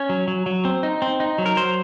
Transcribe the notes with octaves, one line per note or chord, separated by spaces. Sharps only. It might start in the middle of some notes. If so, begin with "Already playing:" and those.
Already playing: C#4 C#5
F#3
F#3
F#3
C4
D#4
C4
D#4
F#3
A#4
F#3 C5